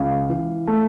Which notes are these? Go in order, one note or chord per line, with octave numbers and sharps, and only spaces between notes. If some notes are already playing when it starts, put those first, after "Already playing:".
Already playing: C#2 F5
E3
A3